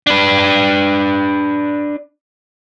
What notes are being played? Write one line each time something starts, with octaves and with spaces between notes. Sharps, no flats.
D4 B4